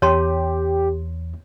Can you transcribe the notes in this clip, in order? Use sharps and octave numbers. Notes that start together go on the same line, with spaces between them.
E2 G4 C#5 A5 C6